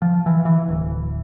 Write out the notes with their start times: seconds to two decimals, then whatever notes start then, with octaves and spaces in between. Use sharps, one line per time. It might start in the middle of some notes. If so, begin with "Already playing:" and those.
0.02 F3
0.26 E3
0.45 E3
0.68 D1